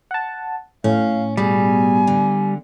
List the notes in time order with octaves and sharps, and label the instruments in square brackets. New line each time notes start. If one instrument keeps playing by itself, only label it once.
[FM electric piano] F#5 A5
[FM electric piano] A2 [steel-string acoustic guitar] C#4 [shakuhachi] F5
[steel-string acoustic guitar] B2 G#4 [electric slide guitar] G3 [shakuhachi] G#5
[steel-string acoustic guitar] D3